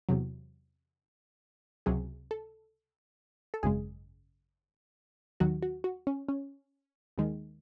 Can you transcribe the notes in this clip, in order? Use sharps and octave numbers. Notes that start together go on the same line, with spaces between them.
E2 C3 F#3
C#2 C3 F#3 G#4
A4
A4
G#1 F#2 C#3 G#3 G#4
D#2 D#3 F#3 F#4
F#4
F#4
C#4
C#4
D#2 D#3 G#3